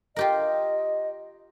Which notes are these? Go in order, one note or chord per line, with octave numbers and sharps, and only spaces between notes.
F4 G4 A#4 D#5